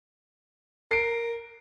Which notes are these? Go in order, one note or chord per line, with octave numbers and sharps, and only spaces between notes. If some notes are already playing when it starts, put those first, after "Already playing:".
A#4 C7 D7